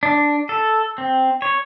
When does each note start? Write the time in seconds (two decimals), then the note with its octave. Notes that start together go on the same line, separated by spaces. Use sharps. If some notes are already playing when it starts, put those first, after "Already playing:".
0.03 D4
0.49 A4
0.98 C4
1.42 C#5